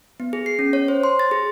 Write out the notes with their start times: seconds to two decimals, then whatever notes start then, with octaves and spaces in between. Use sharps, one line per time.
0.20 B3
0.33 G#4
0.46 C7
0.59 C#4
0.73 C#5
0.88 C5
1.04 C6
1.19 A6
1.31 G#4